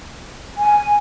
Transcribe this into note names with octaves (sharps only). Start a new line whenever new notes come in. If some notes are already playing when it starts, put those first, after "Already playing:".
G#5